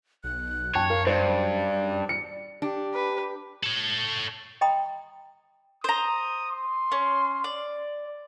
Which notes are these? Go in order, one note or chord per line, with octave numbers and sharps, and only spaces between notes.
B1 F#6
F#2 C#5 G5 A5
A#4 F5
G2 C5 D5
C#7
D4 G4
B4
A4 C#5
D#5 G5 A#5 B5 D#6
C5 A#5 D#6
C6
C#4
D5